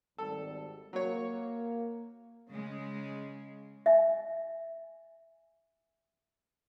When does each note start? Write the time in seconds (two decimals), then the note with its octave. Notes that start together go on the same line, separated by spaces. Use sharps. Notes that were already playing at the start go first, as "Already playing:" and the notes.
0.18 G#1 G3 A4
0.93 F#3 A#3 C#5
2.50 C#3 G#3
3.86 E5 G#5